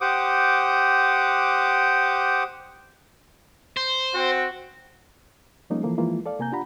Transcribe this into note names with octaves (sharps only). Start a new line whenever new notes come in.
G4 C5 F#5 D6 D#6
C5
C4 F#4
F3 G3 G#3 A#3 C#4 D#4
E3 F3 A#3 A4
E3 F3 G#3 A#3 F4
A4 D5 F5
C3 A#3 G#5 A#5 G6
D4 F4 G4 F#5 A#5 B5